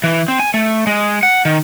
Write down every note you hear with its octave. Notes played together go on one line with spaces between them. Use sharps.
E3
C4
G#5
A3
G#3
F#5
D#3